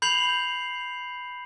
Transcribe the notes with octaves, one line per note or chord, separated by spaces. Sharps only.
B5 G6 C7 F7 F#7